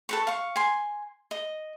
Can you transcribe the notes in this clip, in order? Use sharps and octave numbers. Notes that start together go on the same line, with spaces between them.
A4 B4 C#6
F5 C#6
G#5 C6
D#5